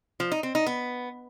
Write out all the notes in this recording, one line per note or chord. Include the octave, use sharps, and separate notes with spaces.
F3
D#4
C4
D#4
B3